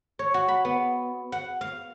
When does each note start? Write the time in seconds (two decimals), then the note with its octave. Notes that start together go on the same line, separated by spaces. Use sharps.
0.19 C#5
0.34 F#4
0.48 B5
0.65 B3
1.32 F#5
1.61 F5